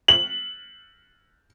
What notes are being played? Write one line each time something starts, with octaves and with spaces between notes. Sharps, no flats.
F#7